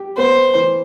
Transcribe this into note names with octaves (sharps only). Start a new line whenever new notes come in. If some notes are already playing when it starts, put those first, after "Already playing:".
Already playing: G4
B3 C5
E3